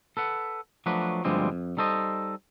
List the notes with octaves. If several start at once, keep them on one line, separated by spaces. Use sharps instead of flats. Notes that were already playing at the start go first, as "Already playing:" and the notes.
A4 B4 F#5
F3 F#3 A3 D4 F#4 B4
D2 G2 F3 G3 G#3 C4
F2
G3 D#4 A4 C5 D#5